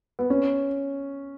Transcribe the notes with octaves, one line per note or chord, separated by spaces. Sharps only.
B3
C#4